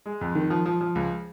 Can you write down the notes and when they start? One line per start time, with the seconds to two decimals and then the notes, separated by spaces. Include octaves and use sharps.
0.06 G#3
0.21 F2
0.35 D#3
0.50 F3
0.66 F3
0.81 F3
0.95 C#2